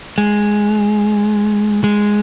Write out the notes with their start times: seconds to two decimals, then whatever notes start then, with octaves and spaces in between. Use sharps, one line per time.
0.18 G#3
1.84 G#3